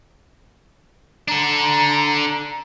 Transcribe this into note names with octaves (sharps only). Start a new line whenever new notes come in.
D4 A4 A#5